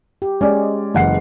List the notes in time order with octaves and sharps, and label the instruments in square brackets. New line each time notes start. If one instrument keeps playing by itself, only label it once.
[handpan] G4
[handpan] G#3 [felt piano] C#4 D5
[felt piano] F#1 F#5 C7 [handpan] E3